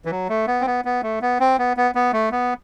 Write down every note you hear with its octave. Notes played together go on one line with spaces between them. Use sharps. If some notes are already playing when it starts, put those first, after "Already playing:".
E3
F#3
A3
B3
C4
B3
B3
A3
B3
C4
B3
B3
B3
A3
B3